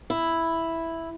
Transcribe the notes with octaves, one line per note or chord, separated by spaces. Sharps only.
E4